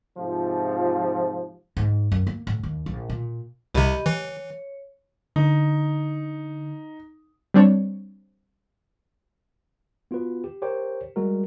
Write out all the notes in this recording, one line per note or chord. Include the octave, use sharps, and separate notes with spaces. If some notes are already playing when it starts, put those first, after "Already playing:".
G#2 C3 F3
G#2
F#2
A#3
A2
D#2
A#1
A#2
C2 C3 G4 D#5 B5
E3 C#5
D3 D#4
G3 C4 D4 C#5
B3 F4 F#4 B4
G4
G4 A#4 C5 C#5 G5
G3 G#3 F#4 A#4